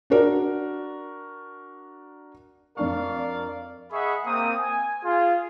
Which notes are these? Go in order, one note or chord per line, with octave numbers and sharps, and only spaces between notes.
D4 F#4 A#4 D5
F2 D4 A#4 D5 F5 C#6
G#4 D#5 E5 F#5 B5 C#6
A#3 C4 D#6
G#5
F4 G#4